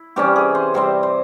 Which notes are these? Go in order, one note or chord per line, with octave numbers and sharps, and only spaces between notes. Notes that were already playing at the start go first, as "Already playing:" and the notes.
Already playing: E4
C3 E3 G3 C#4 G4
G#4
C5
C3 G3 C4 C5
C5